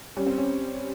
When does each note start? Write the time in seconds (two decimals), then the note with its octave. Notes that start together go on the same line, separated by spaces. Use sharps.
0.17 G3 C#4
0.26 C4
0.38 C#4